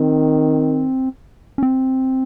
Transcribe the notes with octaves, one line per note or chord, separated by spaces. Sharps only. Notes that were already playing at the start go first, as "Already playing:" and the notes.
Already playing: D#3 C4
C#4
C4